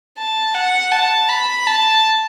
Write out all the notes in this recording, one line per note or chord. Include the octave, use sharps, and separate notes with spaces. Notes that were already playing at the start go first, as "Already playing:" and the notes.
A5
F#5
A5
B5
A5